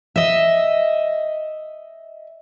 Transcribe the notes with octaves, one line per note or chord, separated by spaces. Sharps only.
D#5 E5